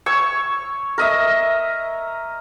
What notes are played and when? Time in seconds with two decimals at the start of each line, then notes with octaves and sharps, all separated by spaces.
0.06 C#5 C#6 E6
0.98 A#4 D#5 E5